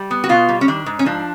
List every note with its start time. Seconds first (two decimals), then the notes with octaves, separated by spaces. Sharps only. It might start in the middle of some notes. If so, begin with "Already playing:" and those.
Already playing: G3
0.11 B3
0.24 F#4
0.29 B2 F4
0.49 G3
0.61 C#4
0.68 D#3 D4
0.86 G#2
0.99 C#4
1.05 F3 D4